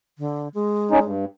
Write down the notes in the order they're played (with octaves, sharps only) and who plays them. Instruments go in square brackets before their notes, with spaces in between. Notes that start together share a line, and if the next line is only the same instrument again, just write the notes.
[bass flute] D3
G#3
[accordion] C#4 D#4
G2